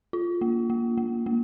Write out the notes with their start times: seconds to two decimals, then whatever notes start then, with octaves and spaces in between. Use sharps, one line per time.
0.13 F4
0.41 A#3
0.70 A#3
0.97 A#3
1.26 A#3